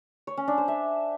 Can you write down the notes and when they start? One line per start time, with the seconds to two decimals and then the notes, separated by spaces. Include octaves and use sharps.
0.27 C#5
0.37 C#4
0.48 D4
0.58 C5
0.68 E5